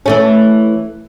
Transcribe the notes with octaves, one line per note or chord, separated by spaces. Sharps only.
E3 A3 C#4